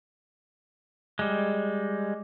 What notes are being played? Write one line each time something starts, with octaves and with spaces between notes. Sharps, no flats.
G3 G#3